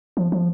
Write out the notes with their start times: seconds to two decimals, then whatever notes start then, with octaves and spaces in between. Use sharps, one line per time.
0.17 F3
0.32 F3